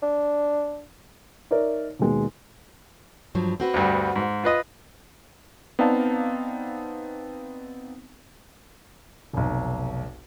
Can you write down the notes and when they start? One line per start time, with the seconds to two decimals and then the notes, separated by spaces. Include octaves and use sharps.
0.03 D4
1.51 D#4 A#4 C#5 D5 E5
1.99 D#2 B2 G#3 A#3
3.35 G2 F3 F#3
3.60 C4 F#4 B4
3.74 D2 G2
4.16 G#2
4.44 F4 B4 D#5
5.79 B3 C4 D#4 D5 F5 A5
9.33 F1 B1